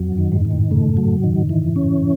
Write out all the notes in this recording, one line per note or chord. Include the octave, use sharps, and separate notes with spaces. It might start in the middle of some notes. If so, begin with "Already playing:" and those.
Already playing: F2 F#3
F#2
D#3
G#2
D#3
A2
C#3 A3
F#3
D#3
E3
C#4